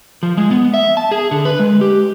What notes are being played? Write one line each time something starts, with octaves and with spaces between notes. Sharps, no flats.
F3
G#3
B3
E5
A5
G#4
D3
B4
G#3
G4